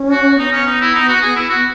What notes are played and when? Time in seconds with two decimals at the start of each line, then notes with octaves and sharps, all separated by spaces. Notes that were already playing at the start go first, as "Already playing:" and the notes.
Already playing: C#4
0.12 F#4
0.38 B3 D#4
0.53 C#4
0.67 D#4
0.81 E4
0.95 D#4
1.09 F#4
1.22 G#4
1.36 E4
1.49 F#4